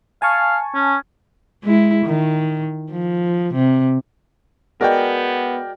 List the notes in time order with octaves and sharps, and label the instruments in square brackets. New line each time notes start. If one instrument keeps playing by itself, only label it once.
[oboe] F5 [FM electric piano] G#5 A5 C#6
[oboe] C#4
[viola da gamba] G#3 E4
D#3
F3
C3
[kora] G#3 F#4 G#4 [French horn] B3 [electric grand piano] A#4 D5 G5